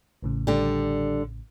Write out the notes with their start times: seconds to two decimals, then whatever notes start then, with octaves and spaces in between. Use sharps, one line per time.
0.22 A1 A2 C#3
0.47 D3 G3